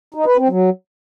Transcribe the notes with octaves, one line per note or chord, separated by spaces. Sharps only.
D#4
B4
C4
F#3